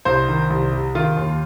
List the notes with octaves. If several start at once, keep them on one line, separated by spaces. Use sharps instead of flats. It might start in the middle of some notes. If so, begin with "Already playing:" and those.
C2 C5
D#3
C2
C3
D#3 F4
D#2